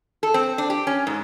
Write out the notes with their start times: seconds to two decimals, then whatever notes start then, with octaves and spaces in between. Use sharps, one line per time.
0.23 A4
0.34 C4
0.58 D4
0.70 G4
0.87 C#4
1.07 G#2